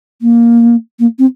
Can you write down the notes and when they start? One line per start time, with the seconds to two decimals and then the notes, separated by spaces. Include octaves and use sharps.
0.21 A#3
0.99 A#3
1.19 C4